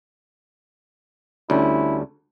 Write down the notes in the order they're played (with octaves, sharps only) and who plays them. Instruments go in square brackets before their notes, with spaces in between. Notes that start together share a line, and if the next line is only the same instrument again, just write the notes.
[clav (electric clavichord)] D2 [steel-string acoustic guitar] G3 C#4 [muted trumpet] E4